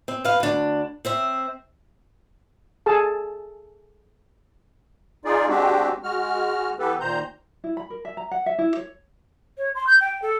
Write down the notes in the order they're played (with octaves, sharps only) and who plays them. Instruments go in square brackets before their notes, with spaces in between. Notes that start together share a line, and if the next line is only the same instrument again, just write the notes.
[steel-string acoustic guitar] C4
B4 F5
D2 D4
C4 C5 E5
[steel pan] G#4 A4 A5
[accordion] D#4 F4 G#4 D5
G#3 C4 D4 F#4 G4
G#3 F#4 F6
E3 B3 G4 A4 B4
A#2 D#3 C5 A#5 G6
[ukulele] E4
B5
A#4
E5
A#5
F#5
E5
E4
C#5
[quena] C#5
C6
G6
G5
A4